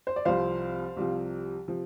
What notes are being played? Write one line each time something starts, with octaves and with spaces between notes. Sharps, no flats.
C5
D5
C2 C3 F3 C5 F5
C2 C3 F3
C3 F3